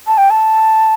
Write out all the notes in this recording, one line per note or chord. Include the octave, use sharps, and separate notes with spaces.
A5
G5
A5